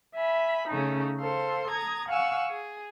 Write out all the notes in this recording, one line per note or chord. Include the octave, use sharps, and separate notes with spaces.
E5 G#5 B5
C#3 A3 C#4 D#4
A4 C5 F5 C6
A#5 D#6 G#6
F5 F#5 G#5 C#6 E6
G#4